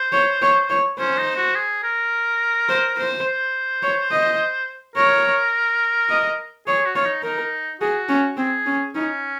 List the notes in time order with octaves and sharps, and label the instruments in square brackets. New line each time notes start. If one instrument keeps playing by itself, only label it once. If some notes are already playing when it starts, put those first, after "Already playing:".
Already playing: [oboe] C5
[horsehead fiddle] C#5
C#5
C#5
[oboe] C#4 [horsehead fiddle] C5
[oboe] D#4
F#4
G#4
A#4
[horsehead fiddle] C5
C5
[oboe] C5
[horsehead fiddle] C#5
D#5
[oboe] A#4 [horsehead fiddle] C#5
[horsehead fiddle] D#5
[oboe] G#4 [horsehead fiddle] C#5
[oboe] F#4
[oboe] F4 [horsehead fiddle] C#5
[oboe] D#4
[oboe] D#4 [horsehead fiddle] A#4
[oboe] F#4 [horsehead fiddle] G#4
[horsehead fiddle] C#4
[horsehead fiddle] C4 [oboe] G#4
[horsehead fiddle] C#4
[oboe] C#4 [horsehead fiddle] D#4